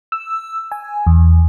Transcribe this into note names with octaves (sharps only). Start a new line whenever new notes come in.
E6
G#5
E2